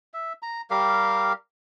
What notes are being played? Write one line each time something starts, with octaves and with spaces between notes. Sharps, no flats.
E5
A#5
G3 G4 A#4 F5